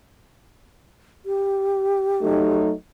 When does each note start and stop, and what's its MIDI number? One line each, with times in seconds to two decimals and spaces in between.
1.26 2.58 67
2.21 2.73 54
2.21 2.73 57
2.21 2.73 63